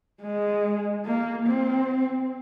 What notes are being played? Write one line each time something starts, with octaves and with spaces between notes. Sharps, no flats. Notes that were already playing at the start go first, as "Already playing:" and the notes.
G#3
A#3
C4